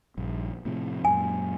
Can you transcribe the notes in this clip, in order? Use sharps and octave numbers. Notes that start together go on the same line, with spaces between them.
A#1 G2
A2 C3 F3
F#2 A#2 G#5